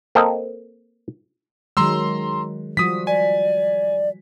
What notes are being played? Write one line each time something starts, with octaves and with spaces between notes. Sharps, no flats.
A#3 C4 A4 A#4 D#5
D#3 F#3 G#3 A#5 C6 E6
F3 G3 F#4 D#6 B6
D5 G#5